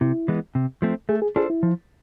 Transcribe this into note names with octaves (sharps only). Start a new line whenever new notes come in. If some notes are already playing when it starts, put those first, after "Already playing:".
C3 E4
E3 G#3 B3
C3
F3 A3 C4
A3 G#4
G#4
D4 F4 G#4 A4 C5
E4
F3